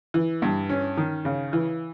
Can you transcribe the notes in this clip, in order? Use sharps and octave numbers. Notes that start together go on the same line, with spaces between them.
E3
G2
C#4
D#3
C#3
E3